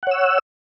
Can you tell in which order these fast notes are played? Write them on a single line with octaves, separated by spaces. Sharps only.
F#5 C#5 E6